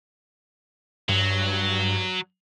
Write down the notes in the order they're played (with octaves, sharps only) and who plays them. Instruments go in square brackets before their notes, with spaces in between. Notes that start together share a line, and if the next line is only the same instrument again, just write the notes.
[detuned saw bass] G2 [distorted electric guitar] F#3